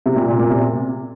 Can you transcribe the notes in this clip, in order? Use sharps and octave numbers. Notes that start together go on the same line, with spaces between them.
C3
A#2
A#2
A#2
C3